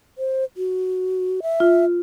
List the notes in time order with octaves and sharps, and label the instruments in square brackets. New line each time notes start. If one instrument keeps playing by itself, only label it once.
[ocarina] C5
F#4
E5
[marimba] F4